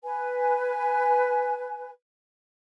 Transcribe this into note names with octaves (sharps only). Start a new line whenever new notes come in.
B4 G#5